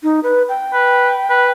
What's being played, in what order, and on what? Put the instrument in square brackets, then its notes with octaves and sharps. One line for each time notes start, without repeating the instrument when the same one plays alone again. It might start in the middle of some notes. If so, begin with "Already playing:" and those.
[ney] D#4
B4
G5
[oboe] B4
B4